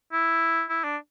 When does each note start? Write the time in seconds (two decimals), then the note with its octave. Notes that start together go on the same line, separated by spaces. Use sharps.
0.12 E4
0.69 E4
0.84 D4